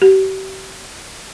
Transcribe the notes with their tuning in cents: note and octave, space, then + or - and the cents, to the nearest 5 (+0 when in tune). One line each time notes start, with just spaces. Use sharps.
G4 -40